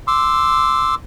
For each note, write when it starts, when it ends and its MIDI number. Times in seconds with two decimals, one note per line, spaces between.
0.07 0.95 84
0.07 0.95 86
0.07 0.95 88